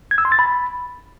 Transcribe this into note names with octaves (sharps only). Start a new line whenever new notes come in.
G#6
E6
C6
A6
B5